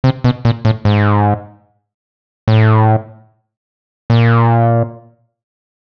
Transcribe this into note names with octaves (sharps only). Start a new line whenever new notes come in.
C3
B2
A#2
A2
G#2
A2
A#2